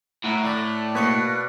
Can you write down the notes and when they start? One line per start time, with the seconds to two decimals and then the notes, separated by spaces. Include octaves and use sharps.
0.24 A2 E4 F#5 A#5
0.43 A3 D5 F#6
0.95 B2 A#3 B4 C#6 C#7